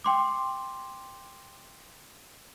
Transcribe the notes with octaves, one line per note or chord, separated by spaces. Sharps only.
G5 C6 D6